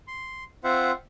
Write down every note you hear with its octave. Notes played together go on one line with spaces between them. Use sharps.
C6
C4 F4 C5 E5 F#5